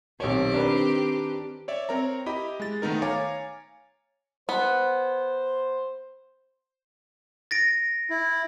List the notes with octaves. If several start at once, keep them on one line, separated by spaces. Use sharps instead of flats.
B1 D#3 C4 G4 C#5
D4 A#4 B4
C#5 D5 E5
C4 A#4 C#5 A#5
E4 G4 D#5 B5
G#3 A6
D#3 A3 B3 D#4 A#4
C#5 F5 G#5 A#5 D6 A6
B3 C5
A6 A#6 D7
E4